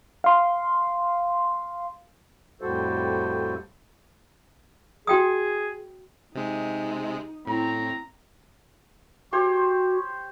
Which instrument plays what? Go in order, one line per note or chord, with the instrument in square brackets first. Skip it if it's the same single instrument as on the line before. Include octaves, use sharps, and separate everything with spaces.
[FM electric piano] F5 C6
[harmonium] F2 A2 G3 F#4 A4 C5
[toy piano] F#4 G5 D#6 [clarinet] G#4
[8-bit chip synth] C3 G#3 [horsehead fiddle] D#4
[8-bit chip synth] A2 [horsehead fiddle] C4 E4 [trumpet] A#5
[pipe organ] F#4 [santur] G4 C5 C#5